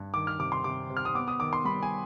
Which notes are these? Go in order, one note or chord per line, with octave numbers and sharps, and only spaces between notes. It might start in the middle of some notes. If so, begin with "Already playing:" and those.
Already playing: G2
D#3 D6
F6
C3 D6
C6
C3 D6
C3
F6
D#6
B3 D6
D#6
D#3 D6
C6
G3 B5
G#5